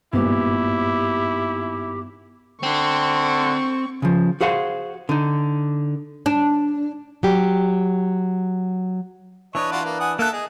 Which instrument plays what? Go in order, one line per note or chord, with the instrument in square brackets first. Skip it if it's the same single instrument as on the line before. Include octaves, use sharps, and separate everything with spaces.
[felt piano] G#1 A#2 [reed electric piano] G2 B3 [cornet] E4 [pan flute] G4
[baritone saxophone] D3 [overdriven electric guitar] C4 [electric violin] C#6
[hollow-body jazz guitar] C#3 F3
F#4 G#4 C5 F5 F#5
D3 D#4
[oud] D4
[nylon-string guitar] F#3 G4
[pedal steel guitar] E3 D4 B4 [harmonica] C#5 D#5
[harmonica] F4 F#4 D5
A#3
F#5 G#5 D#6
[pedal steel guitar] A#3 F#6 [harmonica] A4 E5 A5
[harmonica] G#4 [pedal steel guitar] D#5